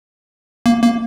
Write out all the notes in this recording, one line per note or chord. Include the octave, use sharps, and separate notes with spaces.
A#3
A#3